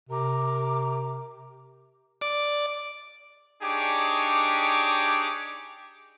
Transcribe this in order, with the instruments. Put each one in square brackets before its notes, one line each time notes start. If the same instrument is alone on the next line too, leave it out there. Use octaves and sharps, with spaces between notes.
[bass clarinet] C3 [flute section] A#4 A#5 D6
[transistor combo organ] D5
[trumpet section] D4 D#4 G4 G#4 C#5 D6